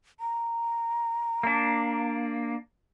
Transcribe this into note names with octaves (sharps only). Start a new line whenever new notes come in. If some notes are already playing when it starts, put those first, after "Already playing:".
A#5
A#3 D4